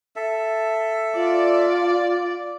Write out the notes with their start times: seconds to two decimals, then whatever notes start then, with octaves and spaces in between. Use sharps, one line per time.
0.16 A4 E5
1.15 F4 D5